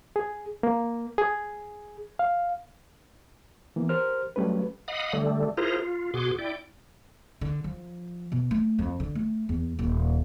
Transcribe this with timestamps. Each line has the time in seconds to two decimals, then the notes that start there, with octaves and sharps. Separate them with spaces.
0.16 G#4
0.63 A#3
1.18 G#4
2.19 F5
3.76 E3 A#3 B3
3.89 G4 A#4 C5 F6
4.36 F#3 G3 A3 C#4 B4
4.88 D#5 F5 F#5 B5 D#6
5.13 D3 G3 A3
5.57 E4 F4 G#4 A#4 C5 A#5
5.79 F4
6.14 B2 F#4 G#4 C6 D6
6.39 E4 D5 G5
7.41 D3
7.64 F3
8.32 B2
8.51 A3
8.79 F2
9.00 D3
9.15 A3
9.49 E2
9.79 D#1